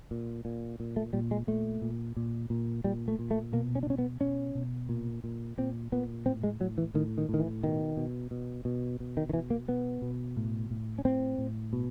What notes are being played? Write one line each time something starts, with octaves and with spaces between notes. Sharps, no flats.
A#2
A#2
A#2
A3
A#2 G3
G#3
A#2 A3
A#2
A#2
A#2
A#2 G3
A3
A#2
A3
B2 A#3
C#4
D4
B2 C#4
B3
B2 C#4
B2
A#2
A#2
A#2 C4
A#2 B3
A2 C4
G#3
A2 F#3
E3
A2 D#3
D#3
A2
D#3
E3
B2 D#3
B2
B2
B2
B2
D#3
D#3
B2 E3
A#3
B2 B3
B2
A2
A2
C#4
A2 C4
A2
B2